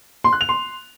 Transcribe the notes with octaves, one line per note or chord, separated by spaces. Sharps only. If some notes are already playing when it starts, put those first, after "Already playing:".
C6
F#6
F7
C6